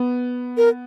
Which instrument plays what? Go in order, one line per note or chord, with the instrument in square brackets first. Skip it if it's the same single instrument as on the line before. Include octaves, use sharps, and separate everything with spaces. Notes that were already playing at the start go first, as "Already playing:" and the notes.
Already playing: [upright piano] B3
[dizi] A#4